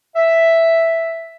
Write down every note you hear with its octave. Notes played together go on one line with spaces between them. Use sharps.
E5